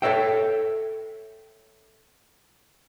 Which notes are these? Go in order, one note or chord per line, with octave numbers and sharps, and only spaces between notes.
A4 A#4 C#5 E5 G5